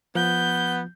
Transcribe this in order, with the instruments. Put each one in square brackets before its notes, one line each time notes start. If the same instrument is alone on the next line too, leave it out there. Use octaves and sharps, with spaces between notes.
[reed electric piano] F3 [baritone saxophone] B3 [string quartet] G6